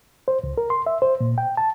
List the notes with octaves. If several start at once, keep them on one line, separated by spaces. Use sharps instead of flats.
C5
C#2
A#4
C6
E5
C5
A#2
G5
A5